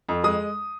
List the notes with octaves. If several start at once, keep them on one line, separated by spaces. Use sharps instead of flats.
F2
G#3 D#6